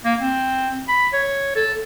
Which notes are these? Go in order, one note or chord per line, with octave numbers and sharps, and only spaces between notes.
A#3
C4
B5
C#5
A4